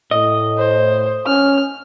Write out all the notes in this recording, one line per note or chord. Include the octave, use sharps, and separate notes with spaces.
A2 D#5
C5
C#4 F6